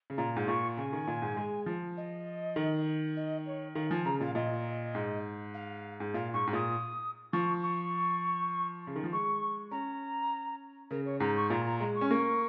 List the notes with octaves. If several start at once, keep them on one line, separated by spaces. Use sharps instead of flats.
C#3
A#2 A#5
G#2
A#2 C#6
C#3 G#5
D#3
A#2
G#2
G#3
F3
D#5
D#3
D#5
C#5
D#3 F5
F3 G#5
C#3 A#5
A#2 F5
A#2 D#5
G#2
F5
G#2
A#2 F5
G#2 C#6
G#2
A#2 D#6
F3 C#6
C#6
C#3
D#3
F3
G#3 C#6
C#4 A#5
C#3 A#4
C#5
G#2 A#5
C#6
A#2 A#5
A#5
G#3 A#5
C#6
C#4
A#3 C#6